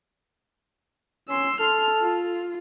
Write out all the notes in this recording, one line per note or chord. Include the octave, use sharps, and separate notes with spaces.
C#4 C6 E6
A4 F6
F4